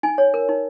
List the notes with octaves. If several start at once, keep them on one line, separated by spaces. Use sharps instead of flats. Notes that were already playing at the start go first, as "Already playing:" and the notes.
D#4 G#5
C#5
A#4
D#4